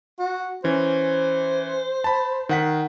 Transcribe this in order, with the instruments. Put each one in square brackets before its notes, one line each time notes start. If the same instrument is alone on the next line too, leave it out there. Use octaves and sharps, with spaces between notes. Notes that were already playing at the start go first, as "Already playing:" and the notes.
[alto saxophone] F#4
[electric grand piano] E3 C#4 [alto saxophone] C5
[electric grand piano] A5 B5
D#3 F#5 B6